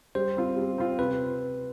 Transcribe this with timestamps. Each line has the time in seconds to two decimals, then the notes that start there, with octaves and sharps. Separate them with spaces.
0.15 G3 C5
0.37 C4 F4
0.57 G3
0.78 C4 F4
0.99 C3 B4